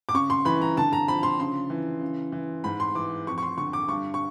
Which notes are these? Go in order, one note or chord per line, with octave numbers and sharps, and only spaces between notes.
D6
C#3 C#6
C6
E3 B5
A#5
D3 A5
A#5
F3 B5
C6
C#3 C6
E3
C#3
E3
G#2 B5
C6
E3 D6
F2 C#6
C#6
C6
D3 C#6
D6
G2 C#6
C#6